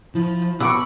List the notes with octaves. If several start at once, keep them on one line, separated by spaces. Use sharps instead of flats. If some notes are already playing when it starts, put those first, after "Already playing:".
F3 E4
B2 B5 C#6 D6 E6